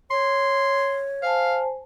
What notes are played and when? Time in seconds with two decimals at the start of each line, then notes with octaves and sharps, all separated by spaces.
0.11 C#5 C6
1.22 C5 F5 G#5 A5